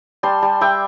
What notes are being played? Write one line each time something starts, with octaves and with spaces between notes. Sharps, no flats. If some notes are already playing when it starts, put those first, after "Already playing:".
G3 A5 C6
G3
G3 E5 G5